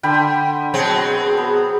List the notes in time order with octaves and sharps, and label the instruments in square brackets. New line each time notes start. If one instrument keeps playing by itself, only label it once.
[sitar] D3 [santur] G5 B5
[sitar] B2 F#3 C4 [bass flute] G#4
[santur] B3